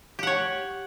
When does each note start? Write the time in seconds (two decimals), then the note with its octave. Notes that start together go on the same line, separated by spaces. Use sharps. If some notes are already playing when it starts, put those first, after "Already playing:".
0.19 G4
0.23 F#5
0.27 C#5